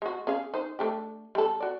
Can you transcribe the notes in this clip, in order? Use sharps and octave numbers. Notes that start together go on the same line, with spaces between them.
G#3 F#4
C#4 G#4 F5
D#4 C5
A3 D4 G4
G3 A4
F#4 D5